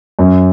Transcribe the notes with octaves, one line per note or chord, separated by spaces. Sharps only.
F#2